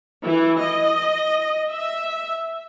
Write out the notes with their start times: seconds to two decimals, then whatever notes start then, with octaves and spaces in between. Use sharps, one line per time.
0.24 E3
0.62 D#5
1.71 E5